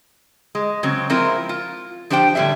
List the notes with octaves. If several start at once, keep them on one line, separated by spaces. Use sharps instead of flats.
G#3
C#3 F#3 C4
F3 G#3 C4 E4 F4 A#4
F4
F3 D4 G4 C5 G5
A2 D3 G3 D4 E5